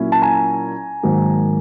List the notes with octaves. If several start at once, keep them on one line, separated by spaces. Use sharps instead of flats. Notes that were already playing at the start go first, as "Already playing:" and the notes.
Already playing: A#2 F#3 A#3 C#4 E4
A5
G#5 A#5
G#2 D#3 F#3 A#3